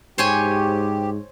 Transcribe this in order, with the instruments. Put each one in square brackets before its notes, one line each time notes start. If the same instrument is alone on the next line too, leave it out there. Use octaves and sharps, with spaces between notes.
[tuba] G#2 [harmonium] G4 [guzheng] C5 C#5 G#5